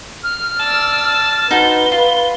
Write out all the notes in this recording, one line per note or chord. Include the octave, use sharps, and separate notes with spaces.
F6
D5 A5 E6
D#4 F#4 B4 C5 G7
F4